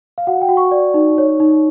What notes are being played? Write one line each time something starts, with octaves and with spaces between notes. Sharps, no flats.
F5
F#4 F#5
G5
F#4
C#6
D5
D#4
C#5
D#4